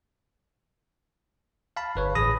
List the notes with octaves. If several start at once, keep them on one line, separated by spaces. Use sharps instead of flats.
F5 A5 B5
G1 B4 C#5
A1 G#4 B5 D#6 A#6